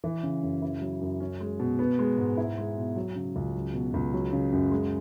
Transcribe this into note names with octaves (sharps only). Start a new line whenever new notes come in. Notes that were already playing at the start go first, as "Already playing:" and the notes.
E3
C#3
F#2
E4
F#3
F#2
C#4
G#3
B2
B3
G#3
G#2
E4
G#3
B2
F#3
C#3
C#2
F#3
B2
C#2
F#3
C#3
F#2
G#3